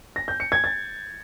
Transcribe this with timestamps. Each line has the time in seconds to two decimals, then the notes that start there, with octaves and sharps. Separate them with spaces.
0.16 A#6
0.28 G6
0.40 C#7
0.52 G#6
0.64 A6